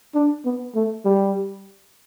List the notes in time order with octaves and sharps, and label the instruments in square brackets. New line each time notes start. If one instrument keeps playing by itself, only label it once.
[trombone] D4
B3
A3
G3